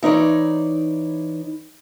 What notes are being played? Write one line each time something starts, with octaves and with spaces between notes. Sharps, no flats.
E3 D#4 C#5 D5